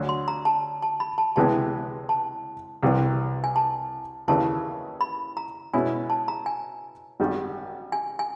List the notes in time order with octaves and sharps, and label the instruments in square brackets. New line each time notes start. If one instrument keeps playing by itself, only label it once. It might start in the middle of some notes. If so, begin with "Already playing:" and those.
Already playing: [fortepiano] D2 D3 F#3
[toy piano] C6
A#5
A5
A5
B5
A5
[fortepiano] C#2 C3 E3 G#3 B3 [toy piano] A5
[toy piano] A5
[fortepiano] C2 C3 E3
[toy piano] G#5
A5
[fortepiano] D#2 C#3 E3 [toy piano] A5
[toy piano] B5
A#5
[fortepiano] B2 G#3 C#4 E4 [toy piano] G#5
[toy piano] A5
A#5
G#5
[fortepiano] G#1 F#2 D#3 G3
[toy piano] G#5
G#5